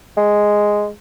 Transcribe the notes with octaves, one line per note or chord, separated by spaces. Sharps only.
G#3